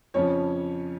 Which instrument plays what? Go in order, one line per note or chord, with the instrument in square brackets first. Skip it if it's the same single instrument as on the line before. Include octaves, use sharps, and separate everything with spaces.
[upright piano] F2 C#3 F3 C#4 C#5